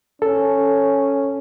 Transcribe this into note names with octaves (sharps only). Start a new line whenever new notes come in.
C#4 A4